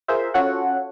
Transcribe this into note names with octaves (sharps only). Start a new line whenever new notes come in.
F4 G#4 A#4 C5 E5
C#4 F4 F#4 A4 C#5 F#5